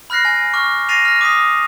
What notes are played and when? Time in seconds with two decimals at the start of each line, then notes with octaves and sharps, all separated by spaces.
0.10 B5 F6 F#6 A#6 C7
0.25 G#5
0.54 C#6 D6 F6
0.89 A6 A#6 C7 D#7 F7
1.05 F6 A#6
1.21 D6 D#6 B6